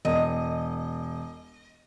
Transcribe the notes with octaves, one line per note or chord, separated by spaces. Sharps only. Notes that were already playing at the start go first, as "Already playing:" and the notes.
E1 D#5